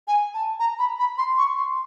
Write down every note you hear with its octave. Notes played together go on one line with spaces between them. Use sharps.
G#5
A5
A#5
B5
B5
C6
C#6
C6